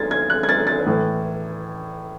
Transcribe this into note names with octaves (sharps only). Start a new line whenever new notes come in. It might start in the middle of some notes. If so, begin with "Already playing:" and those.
Already playing: G#6 A6
G#6
F#6
G#6
A6
A6
A2 E3